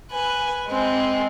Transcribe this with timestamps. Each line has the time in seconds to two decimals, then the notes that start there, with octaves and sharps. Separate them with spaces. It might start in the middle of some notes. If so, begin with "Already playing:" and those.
0.11 B4 G#5
0.67 G#3 C4